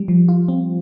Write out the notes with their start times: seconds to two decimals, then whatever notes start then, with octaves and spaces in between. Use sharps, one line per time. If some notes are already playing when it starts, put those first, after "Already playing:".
Already playing: G3
0.08 F3
0.29 F4
0.48 C4